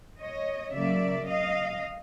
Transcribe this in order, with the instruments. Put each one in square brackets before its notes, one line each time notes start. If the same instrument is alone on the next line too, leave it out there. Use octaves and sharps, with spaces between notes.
[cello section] C#5 D#5
C#3 F#3 A#3 D5 E5
D#5 F5